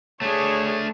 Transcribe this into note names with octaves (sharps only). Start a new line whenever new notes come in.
A3 D4 G#4 C#5